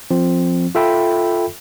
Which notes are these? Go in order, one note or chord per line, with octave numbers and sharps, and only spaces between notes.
F3 C4
F4 A4 E5 G5 B5